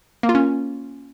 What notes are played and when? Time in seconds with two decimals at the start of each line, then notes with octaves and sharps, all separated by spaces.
0.23 A#3
0.29 F4
0.35 C#4